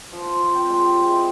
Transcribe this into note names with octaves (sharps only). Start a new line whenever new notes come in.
F3
F4
F3
C4
G#3
G4
G#3
E4